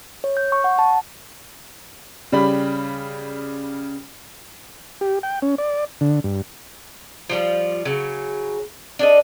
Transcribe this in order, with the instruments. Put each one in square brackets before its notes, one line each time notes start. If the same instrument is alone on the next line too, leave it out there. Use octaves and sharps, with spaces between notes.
[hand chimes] C#5
G6
C#6
F#5
A5
[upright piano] C#3 G3 B5
[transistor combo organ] G4
G5
C#4
D5
D3
G2
[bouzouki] F3 G3 F4
C#3 F#3
D4 A4 D#5